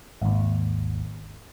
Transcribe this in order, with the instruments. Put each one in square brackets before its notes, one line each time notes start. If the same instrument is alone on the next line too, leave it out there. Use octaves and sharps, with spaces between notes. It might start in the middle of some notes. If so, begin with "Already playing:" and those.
[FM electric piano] G#1 D#2